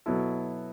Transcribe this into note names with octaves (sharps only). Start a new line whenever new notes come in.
B2 F#3 B3 E4 A4